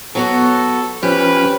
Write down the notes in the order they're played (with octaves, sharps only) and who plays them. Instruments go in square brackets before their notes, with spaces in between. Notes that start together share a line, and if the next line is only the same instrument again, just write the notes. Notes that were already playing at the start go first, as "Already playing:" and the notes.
[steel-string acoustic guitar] F#3 B3 F#4 [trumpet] A4
[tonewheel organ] F3 C#4 [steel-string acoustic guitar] G4 [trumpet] B4